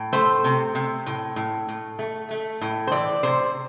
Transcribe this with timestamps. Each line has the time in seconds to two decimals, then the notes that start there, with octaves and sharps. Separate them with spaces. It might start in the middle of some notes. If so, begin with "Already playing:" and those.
Already playing: A2
0.13 A3 C5
0.44 C3
0.75 C3
1.06 A2
1.36 A2
1.69 A2
1.99 A3
2.31 A3
2.61 A2
2.87 C5
2.92 E3 D5
3.23 C3 C5